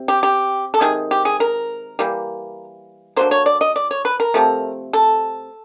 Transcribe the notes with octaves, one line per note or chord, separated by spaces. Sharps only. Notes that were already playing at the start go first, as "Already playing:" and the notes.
Already playing: C3
G4
G4
A4
C3 D#3 G#3 G#4
G4
G#4
A#4
E3 G3 A#3
D3 F#3 A#3 C5
C#5
D5
D#5
D5
C#5
B4
A#4
C3 F3 A3
A4